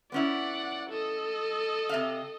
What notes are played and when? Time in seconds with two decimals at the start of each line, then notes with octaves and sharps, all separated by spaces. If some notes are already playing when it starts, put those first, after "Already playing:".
0.12 B3 C#4 E4 D5 F#5
0.90 A4 D#5
1.89 C3 E5 F5